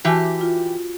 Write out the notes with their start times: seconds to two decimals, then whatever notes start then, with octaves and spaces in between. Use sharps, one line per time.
0.05 E3 F#4 G4 G#5 A5
0.41 F4